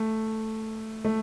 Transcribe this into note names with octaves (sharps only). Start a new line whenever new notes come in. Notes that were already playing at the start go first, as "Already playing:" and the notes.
Already playing: A3
A3